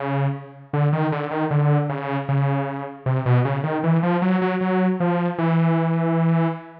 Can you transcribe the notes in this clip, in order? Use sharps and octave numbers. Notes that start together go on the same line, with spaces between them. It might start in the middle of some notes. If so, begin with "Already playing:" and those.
Already playing: C#3
D3
D#3
D3
D#3
D3
C#3
C#3
C3
B2
C#3
D#3
E3
F3
F#3
F#3
F#3
F3
E3